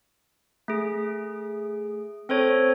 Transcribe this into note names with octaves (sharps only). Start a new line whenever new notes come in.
A3 G#4
C4 A4 C5 C#5